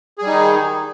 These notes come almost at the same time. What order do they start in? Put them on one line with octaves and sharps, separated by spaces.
G#4 G3 D#4 D#3